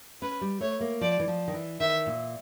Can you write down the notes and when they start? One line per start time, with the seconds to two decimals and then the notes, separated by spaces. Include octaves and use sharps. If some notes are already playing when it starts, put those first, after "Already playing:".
0.22 C#4 B4
0.41 G3
0.61 A3 C#5
0.81 A#3
1.01 F3 D5
1.20 E3
1.28 F3
1.48 D#3
1.54 E3
1.80 D#3 E5
2.07 A#2